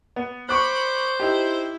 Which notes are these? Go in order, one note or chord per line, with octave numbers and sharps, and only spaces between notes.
B3
C5 B5 C#6 D6 F#6
D#4 E4 G4